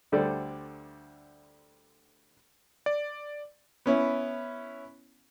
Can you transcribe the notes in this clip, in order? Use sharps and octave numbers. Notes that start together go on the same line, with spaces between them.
D2 D3 G3 A4 C5 D5
D5
B3 C#4 E4